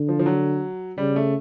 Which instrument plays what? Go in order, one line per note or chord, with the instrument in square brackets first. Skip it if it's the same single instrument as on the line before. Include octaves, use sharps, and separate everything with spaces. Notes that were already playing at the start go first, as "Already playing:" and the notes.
Already playing: [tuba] D3
[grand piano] F3
F3
F#3
[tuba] C#3 [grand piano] G3
[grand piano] A3